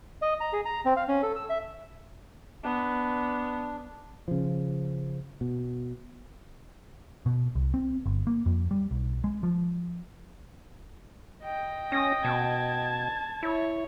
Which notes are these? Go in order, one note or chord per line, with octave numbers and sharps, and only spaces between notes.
D#5
A#5
G#4
A#5
C4
F5
C#4
A4
E6
E5
B3 D4
C#3 F3
B2
B2
C2
C4
G1
A#3
F2
G3
B1
G#3
F3
D#5 G5
C#4 D#6 A#6
B2 A5 G#6
E4 C#5